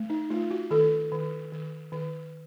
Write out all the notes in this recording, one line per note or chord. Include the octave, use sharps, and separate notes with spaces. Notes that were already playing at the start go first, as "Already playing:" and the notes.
Already playing: A3
D#4
A3 F4
F#4
D#3 A4
D#3
D#3
D#3